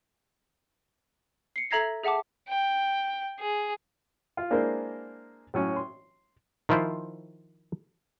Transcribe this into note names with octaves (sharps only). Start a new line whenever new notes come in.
C7 C#7
A4 E5 A#5 G#6 A#6 C7
G#4 E5 F#5 A5 D6
G5
G#4
F4
G#3 A#3 D4 E4 A#4 C5
A2 F#3 C#4 C#6
C6
D#3 F3 E4 F4 C5